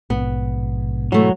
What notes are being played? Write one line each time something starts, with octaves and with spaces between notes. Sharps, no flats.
A#1 G#2 B2 B3
E3 F#3 A3